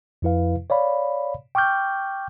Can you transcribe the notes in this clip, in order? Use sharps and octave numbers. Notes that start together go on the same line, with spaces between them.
F2 F3 E4 B4 F5
C#5 D5 F5 B5
G5 C#6 D6 F6 G6